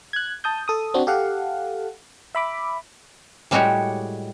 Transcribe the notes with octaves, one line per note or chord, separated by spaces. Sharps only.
F#6 G#6
A5 D#6 G6
A4 D#6
C4 D4 F#4
G4 A4 F5 F#5
E5 B5 D6
A2 G3 G#3 F#4 G4 C#5